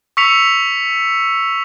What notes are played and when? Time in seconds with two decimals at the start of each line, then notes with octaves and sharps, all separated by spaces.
0.17 C#6 E6 B6 C#7 F7